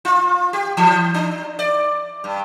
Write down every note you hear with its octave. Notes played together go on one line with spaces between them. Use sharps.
F4
G4
E3
D4
D5
G2